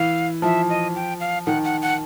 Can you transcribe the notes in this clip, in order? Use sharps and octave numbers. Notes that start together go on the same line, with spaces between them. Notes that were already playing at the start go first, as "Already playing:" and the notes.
Already playing: E3 F5
F3 E5
D#5
G5
F5
D#3 F#5
F#5
F#5